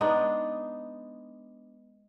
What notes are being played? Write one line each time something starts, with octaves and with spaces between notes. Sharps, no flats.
G#3 B3 D4 D#4